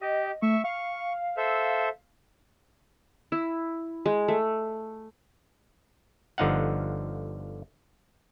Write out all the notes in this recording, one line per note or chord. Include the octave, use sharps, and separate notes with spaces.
G4 D#5
A3 E5 C#6
F5 C#6
A4 C5 E5
E4
G#3
A3
G1 D3 F3 D#4 F5 F#5